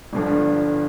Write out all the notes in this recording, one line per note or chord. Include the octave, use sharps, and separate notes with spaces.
G1 G2 D3 F3